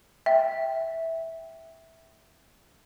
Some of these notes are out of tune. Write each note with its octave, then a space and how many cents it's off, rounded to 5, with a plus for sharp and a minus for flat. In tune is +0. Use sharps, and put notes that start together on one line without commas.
E5 -10 G5 +0